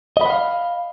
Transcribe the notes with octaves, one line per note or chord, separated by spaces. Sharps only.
D#5 F5 F#5 B5